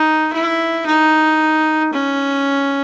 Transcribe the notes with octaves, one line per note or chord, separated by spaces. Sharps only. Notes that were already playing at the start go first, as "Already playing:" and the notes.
Already playing: D#4
E4
D#4
C#4